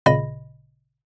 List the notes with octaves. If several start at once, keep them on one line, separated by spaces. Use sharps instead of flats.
G#1 A#2 C#3 D#5 B5 A#6